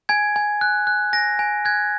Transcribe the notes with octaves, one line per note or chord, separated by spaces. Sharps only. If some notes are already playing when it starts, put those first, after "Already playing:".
G#5 G#6
G#5
F#6
F#6
G#5 A#6
G#5
F#6 G#6